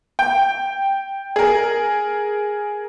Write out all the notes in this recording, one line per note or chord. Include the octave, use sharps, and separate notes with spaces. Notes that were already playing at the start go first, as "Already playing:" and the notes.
G5
G#4 A#4